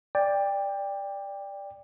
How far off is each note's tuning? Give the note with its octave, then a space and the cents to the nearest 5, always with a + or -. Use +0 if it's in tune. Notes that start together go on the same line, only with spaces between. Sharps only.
D5 +0 G5 +20